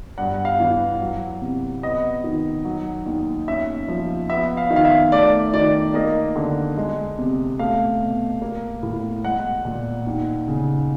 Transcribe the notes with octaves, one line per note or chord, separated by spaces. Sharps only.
G2 F#5
F5
E3
F#3
C3
B3 D#5
D#3
F#3
D#2
C#4 E5
F3
B3 E5
F5
D#3
F5
E5
A3 D5
D#3 D5
A#3 D#5
D3
G#3
C3
A3 F5
B2
A#3
A2
G#3 F#5
A#2
D#2
C#3